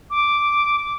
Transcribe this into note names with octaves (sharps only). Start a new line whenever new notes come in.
D6